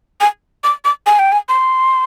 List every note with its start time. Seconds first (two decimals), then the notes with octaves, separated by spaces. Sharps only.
0.21 G#5
0.64 D6
0.85 D6
1.06 G#5
1.19 G5
1.32 G#5
1.49 C6